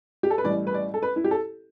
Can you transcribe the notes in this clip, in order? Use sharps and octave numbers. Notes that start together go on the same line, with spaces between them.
G4
A4
B4
A1 A2 G3 D5
B4
D5
A4
B4
E4
G4
A4